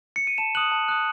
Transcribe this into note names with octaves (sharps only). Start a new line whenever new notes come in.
C#7
D#7
A5 E7
D#6 F#6 F#7
A5
D#6 F#6